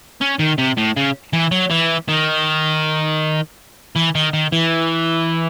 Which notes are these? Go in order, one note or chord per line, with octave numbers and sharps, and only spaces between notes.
C#4
D#3
C3
A2
C#3
E3
F#3
E3
D#3
E3
D#3
D#3
E3